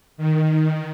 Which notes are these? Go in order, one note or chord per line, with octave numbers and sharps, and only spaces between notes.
D#3